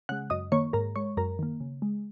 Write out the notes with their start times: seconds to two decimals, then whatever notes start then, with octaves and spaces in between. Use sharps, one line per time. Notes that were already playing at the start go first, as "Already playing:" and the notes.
0.09 C#3 G#3 F#5 F#6
0.30 F#2 D#5 D#6
0.52 D#3 A#3 C#5 C#6
0.73 G#2 A#4 A#5
0.96 G#3 C#5 C#6
1.17 F#2 A#4 A#5
1.39 D#3 A#3
1.60 C#3
1.82 G#3